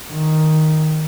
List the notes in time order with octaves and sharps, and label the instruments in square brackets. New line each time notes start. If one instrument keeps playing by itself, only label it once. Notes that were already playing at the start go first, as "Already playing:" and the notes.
[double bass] D#3